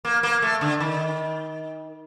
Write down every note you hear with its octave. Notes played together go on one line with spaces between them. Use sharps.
A#3
A#3
A3
D3
D#3